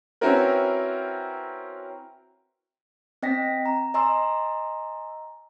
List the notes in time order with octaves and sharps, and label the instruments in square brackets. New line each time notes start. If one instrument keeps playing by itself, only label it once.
[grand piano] C4 C#4 E4 F#4 A#4 B4
[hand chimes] C4 D#5 G5 A#6 B6
A#5
D#5 G#5 A#5 C6 E6